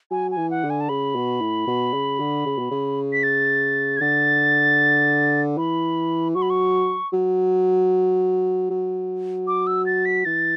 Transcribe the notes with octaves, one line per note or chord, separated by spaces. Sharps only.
F#3 G#5
G#5
E3
F#5
D3
G#5
A5
C#3 B5
B2
A2
B2
C#3
D3
C#3
B2
C#3
B6
A6
G#6
D3 A6
E3 B5
F#3 C#6
B5
C#6
F#3
F#3
D6
E6
A6
B6
E3 A6